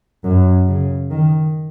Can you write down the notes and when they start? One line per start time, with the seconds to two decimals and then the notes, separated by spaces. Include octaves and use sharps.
0.24 F#2
0.67 C#3
1.10 D#3